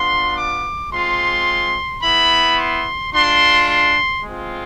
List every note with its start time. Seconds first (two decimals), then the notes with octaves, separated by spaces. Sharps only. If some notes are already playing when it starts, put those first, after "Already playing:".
Already playing: B3 D4 F4 C6
0.36 D6
0.91 G#3 C4 F4 C6
2.02 B3 E4 B5
2.58 C6
3.13 G#3 D4 F4 C6
3.68 C6
4.24 G#3 C4 F4